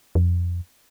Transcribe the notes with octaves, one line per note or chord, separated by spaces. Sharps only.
F2